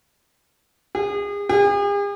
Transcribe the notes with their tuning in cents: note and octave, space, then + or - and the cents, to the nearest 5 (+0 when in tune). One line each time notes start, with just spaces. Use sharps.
G#4 -35
G#4 -45